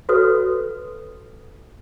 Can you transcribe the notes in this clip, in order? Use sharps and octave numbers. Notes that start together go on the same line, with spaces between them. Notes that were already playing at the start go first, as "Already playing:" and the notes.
F#4 A4 B4 C#5